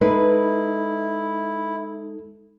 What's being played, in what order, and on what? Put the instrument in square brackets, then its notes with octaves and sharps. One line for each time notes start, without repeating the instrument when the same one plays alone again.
[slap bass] G#3 [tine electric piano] D#4 A4 [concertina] E4 [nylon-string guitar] B4